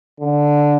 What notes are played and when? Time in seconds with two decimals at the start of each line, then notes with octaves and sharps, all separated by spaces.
0.20 D3